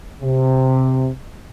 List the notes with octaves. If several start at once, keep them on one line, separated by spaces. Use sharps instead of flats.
C3